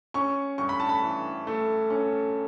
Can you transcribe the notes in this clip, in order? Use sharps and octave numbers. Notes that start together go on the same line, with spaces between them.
C#4 C#6
G2 C#6
B5
A5
B5
E3
A3
C#4